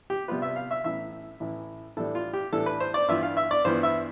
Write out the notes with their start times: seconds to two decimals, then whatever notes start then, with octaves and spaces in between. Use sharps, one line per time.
0.10 G4
0.28 C3 G3 B3 F4 B4
0.42 E5
0.56 F5
0.71 E5
0.84 A1 A2 E3 E5
1.40 A1 A2 E3
1.97 A2 E3 G3 D4 A4
2.15 F4
2.33 G4
2.52 A2 E3 G3 D4 A4
2.66 B4
2.80 C5
2.94 D5
3.08 G2 E3 B3 F4 E5
3.23 F5
3.37 E5
3.51 D5
3.65 G2 E3 B3 F4 C5
3.83 E5